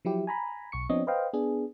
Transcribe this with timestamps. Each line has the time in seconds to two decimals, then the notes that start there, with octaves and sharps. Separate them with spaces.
0.05 F3 F#3 E4 G4
0.27 G#5 A#5 B5
0.72 B1 C#6 C#7
0.90 F3 B3 C4 D4 C#5 D#5
1.07 B4 C5 D#5 F5 G5
1.33 B3 D4 G#4